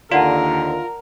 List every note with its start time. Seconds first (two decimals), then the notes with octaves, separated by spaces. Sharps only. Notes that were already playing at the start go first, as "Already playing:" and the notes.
0.12 D#2 D3 F4 A#4 D5 F#5 A5